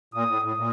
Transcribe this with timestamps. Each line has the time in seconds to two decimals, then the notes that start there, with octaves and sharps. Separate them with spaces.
0.14 A#2 D#6
0.28 A2
0.42 A2 D#6
0.57 A#2